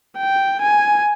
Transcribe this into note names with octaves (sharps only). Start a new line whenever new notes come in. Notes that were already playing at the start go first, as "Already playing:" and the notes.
G5
G#5